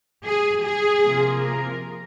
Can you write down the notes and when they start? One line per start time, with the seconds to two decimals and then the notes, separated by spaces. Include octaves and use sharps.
0.24 G#4
0.63 G#4
1.03 C3 F3 A#3 F4
1.42 A#4